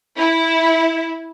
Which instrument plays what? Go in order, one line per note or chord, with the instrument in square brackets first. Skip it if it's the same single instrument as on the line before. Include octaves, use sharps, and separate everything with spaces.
[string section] E4